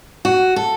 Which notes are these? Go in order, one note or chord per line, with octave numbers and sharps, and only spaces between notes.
F#4
A4